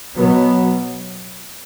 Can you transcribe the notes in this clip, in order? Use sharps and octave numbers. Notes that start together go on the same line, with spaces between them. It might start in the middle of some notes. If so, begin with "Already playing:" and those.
B2 F#3 B3